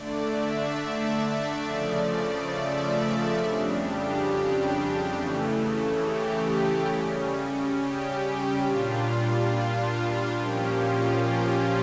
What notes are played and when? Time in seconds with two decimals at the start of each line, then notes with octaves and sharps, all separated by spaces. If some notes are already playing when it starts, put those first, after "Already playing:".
Already playing: D3 A3 D4 D5
0.32 E5
0.77 E5
1.19 E5
1.63 C#3 F3 A3 D5
2.50 E5
2.95 E5
3.38 F2 C#3 G3 D4
3.82 G4
5.12 C#3 E3 A3
5.99 G4
6.88 C#3 G3 C#4
7.75 G4
8.18 G4
8.62 A#2 G3 D4 F4
10.36 A#2 F3 A#3 C#4 G4
10.80 F4
11.23 G4